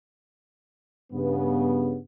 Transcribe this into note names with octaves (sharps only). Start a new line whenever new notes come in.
G2 C#3 B3